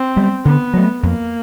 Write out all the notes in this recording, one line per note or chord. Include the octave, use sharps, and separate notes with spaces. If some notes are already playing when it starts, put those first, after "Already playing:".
Already playing: C4
G3 B3
D3 B3
F#3 A3
F2 A#3